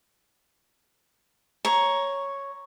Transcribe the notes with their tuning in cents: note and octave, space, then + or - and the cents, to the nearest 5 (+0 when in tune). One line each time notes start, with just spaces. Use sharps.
C#5 +0 A#5 +10